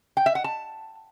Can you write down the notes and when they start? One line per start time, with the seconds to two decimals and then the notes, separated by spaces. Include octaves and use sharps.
0.17 G5
0.26 E5
0.35 F#5
0.44 A5